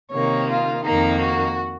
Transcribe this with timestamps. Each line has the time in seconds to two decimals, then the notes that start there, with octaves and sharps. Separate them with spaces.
0.11 C3 D#3 A#3 C#5
0.49 F4
0.84 F2 D#3 A#3 D#4
1.20 F#4